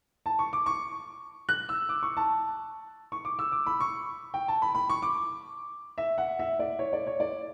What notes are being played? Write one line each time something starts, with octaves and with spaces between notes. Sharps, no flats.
A5
C#6
D6
C#6
F#6
E6
D6
C#6
A5
C#6
D6
E6
D6
B5
C#6
G5
A5
B5
B5
C#6
D6
E5
F#5
E5
D5
C#5
D5
C#5
D5